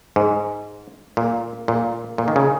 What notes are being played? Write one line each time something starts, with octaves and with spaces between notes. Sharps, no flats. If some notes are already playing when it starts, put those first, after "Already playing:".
G#2
A#2
A#2
A#2
D#3
C#3